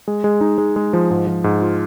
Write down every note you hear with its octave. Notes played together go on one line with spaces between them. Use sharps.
G#3
G#3
D#4
G#3
G#3
F3
G#2
F3
G#2
F4